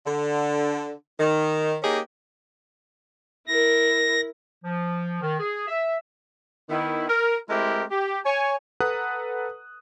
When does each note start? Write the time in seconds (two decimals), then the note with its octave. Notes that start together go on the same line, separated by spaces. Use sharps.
0.06 D3
1.19 D#3
1.83 A#3 C#4 D#4 G4 G#4
3.47 E4 A#4 A#6
4.64 F3
5.22 D#3
5.40 G#4
5.68 E5
6.70 D#3 B3 E4
7.09 A#4
7.49 G#3 A3 C4 E4 G4 A#4
7.91 G4
8.25 C#5 G#5
8.80 A4 B4 F#5 A#5 D#6 F#6